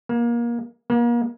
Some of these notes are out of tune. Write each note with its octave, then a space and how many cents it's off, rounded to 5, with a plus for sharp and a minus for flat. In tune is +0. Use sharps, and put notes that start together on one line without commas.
A#3 +25
A#3 +35